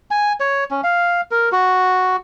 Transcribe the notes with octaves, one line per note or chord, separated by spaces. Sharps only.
G#5
C#5
C#4
F5
A#4
F#4